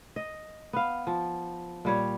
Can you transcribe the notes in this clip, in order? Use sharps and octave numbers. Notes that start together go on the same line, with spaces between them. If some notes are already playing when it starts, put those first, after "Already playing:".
D#5
B3 F5
F3
A#2 G3 C#5